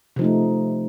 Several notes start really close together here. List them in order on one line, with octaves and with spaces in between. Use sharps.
C3 F3 D#4 A3